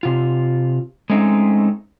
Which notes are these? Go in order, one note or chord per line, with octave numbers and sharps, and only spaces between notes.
C3 F4
G#3 A3 C4 C#4 D#4